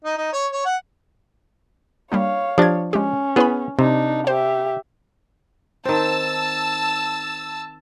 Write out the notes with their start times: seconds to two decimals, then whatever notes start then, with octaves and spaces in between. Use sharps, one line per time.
0.05 D#4
0.17 D#4
0.33 C#5
0.52 C#5
0.65 F#5
2.12 G3 A#3 D4 C#5 F5
2.58 F3 D4 G4 G#6
2.93 G#3 C#4 G4
3.36 B3 E4 G#4 B4 B5
3.79 C3 D4 D#4
4.27 G4 C5 E5
5.85 D#3 C4 A5 E6